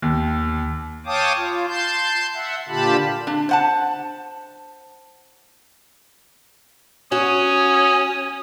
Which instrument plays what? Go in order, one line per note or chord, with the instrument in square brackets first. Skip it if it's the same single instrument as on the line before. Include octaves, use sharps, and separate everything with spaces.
[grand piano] D#2
[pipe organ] C#5 F5 G5 A5 D6 D#6
F4
A5 C6 G6
E5 F#5
A#2 D3 F4 G4 A5 B5
[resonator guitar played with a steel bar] D4
C5 F#5 A5
[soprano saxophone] C#4 [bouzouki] F#4 [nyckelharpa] D#6